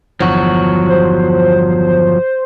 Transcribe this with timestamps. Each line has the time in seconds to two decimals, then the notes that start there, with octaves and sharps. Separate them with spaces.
0.20 G1 E2 F3 F#3 F#4
0.89 C5